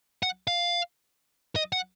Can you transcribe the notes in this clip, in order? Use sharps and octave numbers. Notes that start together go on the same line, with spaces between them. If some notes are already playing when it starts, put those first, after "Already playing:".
F#5
F5
D#5
F#5